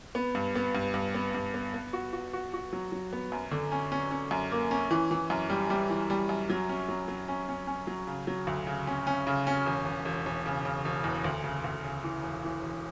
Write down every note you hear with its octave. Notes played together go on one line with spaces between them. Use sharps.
B3
G2
B3
G2
G2
B3
G2
B3
B3
F#4
F#4
F#4
F#4
F#3
F#3
B3
F#2
D3
C#4
C#4
C#4
F#2
A#3
C#4
E3
E3
F#2
G3
G3
E3
G3
F#2
F#3
C#4
F#3
F#3
C#4
C#4
C#4
F#3
C#3
F#3
D2
C#3
C#4
C#4
C#3
C#4
E1
E1
E1
E1
C#3
C#3
E1
E2
D2
C#3
D2
C#3
E3
E1
E3
E1